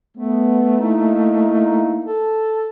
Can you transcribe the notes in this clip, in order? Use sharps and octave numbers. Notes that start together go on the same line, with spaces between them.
A3 B3
A#3 D#4 E4
A4